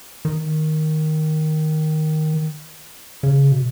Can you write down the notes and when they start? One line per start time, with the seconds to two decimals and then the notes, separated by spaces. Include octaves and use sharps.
0.25 D#3
3.23 C#3
3.52 B2